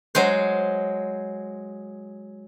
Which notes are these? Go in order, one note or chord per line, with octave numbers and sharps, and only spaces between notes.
F#3 G#3 C5